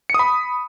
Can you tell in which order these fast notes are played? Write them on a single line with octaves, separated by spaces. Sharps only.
C#7 D#6 B5